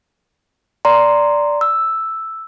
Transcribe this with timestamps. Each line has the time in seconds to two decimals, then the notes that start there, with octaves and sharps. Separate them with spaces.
0.85 D5 A#5 C6
1.61 E6